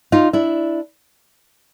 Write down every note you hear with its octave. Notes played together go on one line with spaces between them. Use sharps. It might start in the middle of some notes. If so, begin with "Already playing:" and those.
D#4 F4
D4 E4